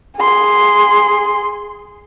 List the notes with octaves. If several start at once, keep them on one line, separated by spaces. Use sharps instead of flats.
G#4 C6